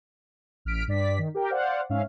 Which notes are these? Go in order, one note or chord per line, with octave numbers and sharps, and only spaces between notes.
A1 F6 B6 D7
G2 D5 B6
D#3
G4 A#4 G5
C5 D5 F5 F#5
G#2 C#4 E5 F5